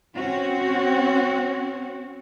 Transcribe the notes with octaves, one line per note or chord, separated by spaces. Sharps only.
C4 C#4 F#4